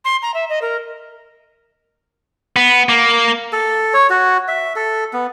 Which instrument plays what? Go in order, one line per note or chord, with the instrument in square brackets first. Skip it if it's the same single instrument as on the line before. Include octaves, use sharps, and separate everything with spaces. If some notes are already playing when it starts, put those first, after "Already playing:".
[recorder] C6
A#5
E5
D#5
A#4
[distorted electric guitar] B3
A#3
[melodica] A4
C#5
F#4
E5
A4
B3